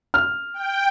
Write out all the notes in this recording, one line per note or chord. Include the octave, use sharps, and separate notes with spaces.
F6
G5